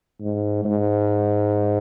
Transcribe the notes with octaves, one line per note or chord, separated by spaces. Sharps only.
G#2
G#2